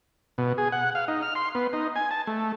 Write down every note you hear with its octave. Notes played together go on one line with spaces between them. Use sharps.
B2
G#4
F#5
F5
D#4
F6
C6
B3
D#4
G#5
A5
A3